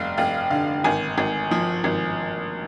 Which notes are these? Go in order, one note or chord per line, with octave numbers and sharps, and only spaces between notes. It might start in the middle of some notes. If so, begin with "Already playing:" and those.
Already playing: F1 G3 F5
F1 F5
D3 F5
G#1 G#5
G#1
F3
G#1